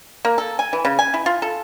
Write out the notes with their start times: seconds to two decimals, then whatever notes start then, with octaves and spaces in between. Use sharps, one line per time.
0.25 A#3
0.38 A4
0.59 G#5
0.73 E3
0.85 C#3
0.99 G#5
1.14 E4
1.26 F4
1.42 A4